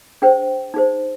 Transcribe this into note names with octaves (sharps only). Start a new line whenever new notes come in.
D4 G#4 C5 G5
D#4 G#4 C5